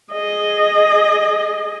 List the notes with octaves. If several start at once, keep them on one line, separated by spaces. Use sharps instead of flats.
G#4 D#5